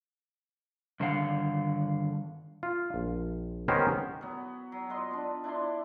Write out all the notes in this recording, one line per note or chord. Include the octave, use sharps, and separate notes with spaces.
G2 D3 D#3 F5 F#5
F4
A#1
D#3 B3 C#4 G4 A#4 C5
F#3 B3
F#3
F4 B4 D#5 C6
B3 D4
D4 E4 D5 C6